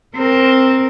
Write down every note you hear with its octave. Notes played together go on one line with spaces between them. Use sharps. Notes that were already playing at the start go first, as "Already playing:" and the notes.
C4 A#4